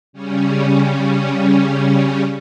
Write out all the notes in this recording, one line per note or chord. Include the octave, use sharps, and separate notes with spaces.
C#3 G3 C#4